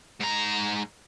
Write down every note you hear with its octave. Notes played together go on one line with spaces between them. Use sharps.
G#2 A#5